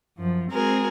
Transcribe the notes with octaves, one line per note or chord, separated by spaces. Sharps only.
F#2 F3
G#3 C4 F#4 G#4 A#4